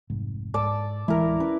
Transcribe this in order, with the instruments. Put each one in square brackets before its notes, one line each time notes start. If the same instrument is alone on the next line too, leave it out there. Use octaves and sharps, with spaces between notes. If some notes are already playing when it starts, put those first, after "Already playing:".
[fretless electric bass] F1 C2 G#2
[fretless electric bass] G#2 [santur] D5 A5 E6
[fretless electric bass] D1 E3 G#3 [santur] E4 A#4
[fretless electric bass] C#4 [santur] B4